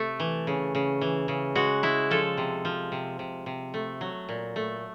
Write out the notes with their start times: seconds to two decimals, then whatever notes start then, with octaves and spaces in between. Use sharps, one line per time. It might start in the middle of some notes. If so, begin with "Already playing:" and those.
Already playing: C3 A3
0.20 E3
0.47 C#3
0.75 C#3
1.01 E3
1.28 C#3
1.55 G#3 F#4
1.83 G#3 E4
2.11 F3 A4
2.37 C3
2.65 F3
2.92 C3
3.19 C3
3.46 C3
3.74 A3
4.01 F#3
4.29 A#2
4.56 A3